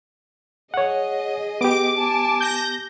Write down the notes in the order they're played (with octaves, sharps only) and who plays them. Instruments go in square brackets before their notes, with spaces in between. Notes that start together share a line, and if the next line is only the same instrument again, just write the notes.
[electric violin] G#4 D#5 [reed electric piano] C#5 F#5
[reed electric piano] B3 G4 [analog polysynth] D6
[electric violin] G#5 A5
[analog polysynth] G6 A#6